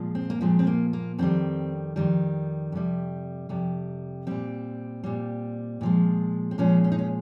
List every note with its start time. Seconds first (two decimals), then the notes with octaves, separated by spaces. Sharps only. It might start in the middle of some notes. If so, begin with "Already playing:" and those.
Already playing: A#2 F3 G#3
0.15 C4
0.30 A#3
0.41 A#2 F3 G#3 C4
0.59 C4
0.67 A#3
0.93 A#3
1.18 F2 D#3 G3 C4
1.96 F2 D#3 G3
2.72 F2 C3 G3
3.49 F2 C3 G3
4.27 A#2 G3 C4
5.04 A#2 G3
5.81 A#2 F3 G#3
6.51 C4
6.58 A#2 F3 G#3 C#4
6.84 C#4
6.92 D#4
6.99 C#4